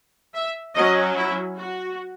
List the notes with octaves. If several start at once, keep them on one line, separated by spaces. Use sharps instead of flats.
E5
F#3 C#4 D#5
E4
F#4